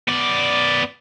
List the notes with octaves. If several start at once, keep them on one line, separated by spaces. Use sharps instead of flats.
B3 D5